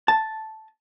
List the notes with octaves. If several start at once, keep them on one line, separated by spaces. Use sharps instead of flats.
A5